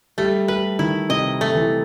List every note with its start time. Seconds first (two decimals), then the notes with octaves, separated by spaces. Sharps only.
0.18 G3 A3
0.48 G3 B4
0.79 D#3 E4
1.09 C3 D#5
1.41 A3
1.55 E3